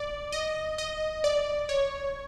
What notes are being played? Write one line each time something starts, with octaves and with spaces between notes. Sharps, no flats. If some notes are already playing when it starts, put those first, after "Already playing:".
Already playing: D5
D#5
D#5
D5
C#5